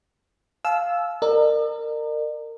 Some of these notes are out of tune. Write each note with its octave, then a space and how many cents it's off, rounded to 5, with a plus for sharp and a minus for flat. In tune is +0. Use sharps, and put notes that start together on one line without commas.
F5 +0 A5 -40 E6 +0
A#4 -25 D5 +45